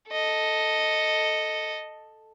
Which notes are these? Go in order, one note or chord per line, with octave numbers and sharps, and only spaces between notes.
A4 D#5